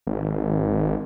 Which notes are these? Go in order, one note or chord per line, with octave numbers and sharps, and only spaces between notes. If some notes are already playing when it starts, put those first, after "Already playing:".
G#1